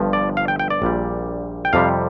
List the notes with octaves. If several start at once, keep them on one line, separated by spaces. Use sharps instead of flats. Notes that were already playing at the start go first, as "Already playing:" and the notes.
Already playing: G1 G2 F3
D5
F5
G5
G5
D5
A#1 A#2 G3
G5
F2 C3 G3 F5